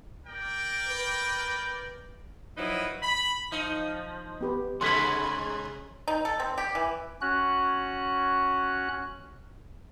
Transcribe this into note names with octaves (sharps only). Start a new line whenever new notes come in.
A#4 D5 G5
B4
F3 F#3 D#4 E4 B4
B5
F3 D#4
B3 G4 B4
C3 G#3 C#4 F#5 B5 C6
D#4
A4
C4
G4
E3
C#4 F#4 F#6